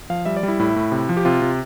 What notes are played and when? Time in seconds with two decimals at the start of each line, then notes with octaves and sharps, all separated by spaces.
0.10 F3 F5
0.25 G3 E5
0.37 D5
0.43 G3
0.48 E4
0.59 A2 E4
0.76 A2
0.92 C3
1.09 F3
1.17 G4
1.25 C3 F4
1.42 C3